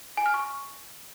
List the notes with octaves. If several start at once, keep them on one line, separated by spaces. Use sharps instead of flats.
G#5
F6
C#6